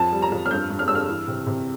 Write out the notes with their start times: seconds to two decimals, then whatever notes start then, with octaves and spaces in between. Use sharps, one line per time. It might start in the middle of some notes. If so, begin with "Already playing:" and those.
Already playing: F2 A5
0.13 G3
0.22 A#5
0.32 F2
0.46 F6
0.51 G2 G6
0.70 G2
0.79 F6
0.88 G2 E6
0.95 F6
1.09 E3
1.28 C3
1.47 C3